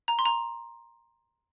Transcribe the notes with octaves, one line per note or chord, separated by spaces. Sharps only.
A#5
C6
A#5